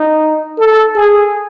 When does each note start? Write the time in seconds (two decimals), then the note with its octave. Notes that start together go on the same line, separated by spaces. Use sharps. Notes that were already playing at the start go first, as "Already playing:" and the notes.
Already playing: D#4
0.58 A4
0.95 G#4